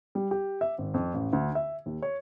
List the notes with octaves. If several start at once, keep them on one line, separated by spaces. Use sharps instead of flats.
G3
G4
E5
G#1
F2
A1
D2
E5
D#2
C#5